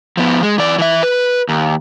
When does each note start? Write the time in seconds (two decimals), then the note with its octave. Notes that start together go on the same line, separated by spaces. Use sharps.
0.17 F3 B3
0.43 G#3
0.58 E3 D5
0.78 E3 E5
1.03 B4
1.49 D#2